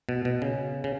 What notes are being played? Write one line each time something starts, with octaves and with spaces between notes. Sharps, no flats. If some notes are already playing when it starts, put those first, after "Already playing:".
B2
B2
C#3
C#3